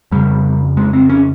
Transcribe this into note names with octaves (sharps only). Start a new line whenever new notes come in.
F2 C#3 G3
G#3
C4
C#4